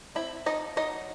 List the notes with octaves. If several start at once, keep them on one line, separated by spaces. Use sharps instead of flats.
C4 E4 E5
F3 D#4 D#5
F#3 D#4 D#5